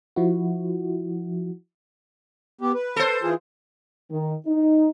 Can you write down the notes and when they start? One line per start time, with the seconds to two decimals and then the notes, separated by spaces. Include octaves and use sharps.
0.16 F3 E4 F#4
2.61 B3 G4
2.74 B4
2.96 A4 C5
3.22 E3 F4 G#4
4.11 D#3
4.47 D#4